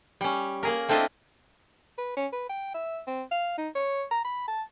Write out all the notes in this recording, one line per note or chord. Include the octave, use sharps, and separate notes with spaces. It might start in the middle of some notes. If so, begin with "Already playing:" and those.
G3 C#4
A#3 G#4 A#4
A3 C4 D4 E4 F4 D#5
B4
C#4
B4
G5
E5
C4
F5
D#4
C#5
A#5
B5
A5